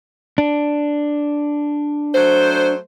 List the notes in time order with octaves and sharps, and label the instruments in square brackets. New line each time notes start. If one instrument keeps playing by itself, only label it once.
[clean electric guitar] D4
[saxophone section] F#3 A3 C5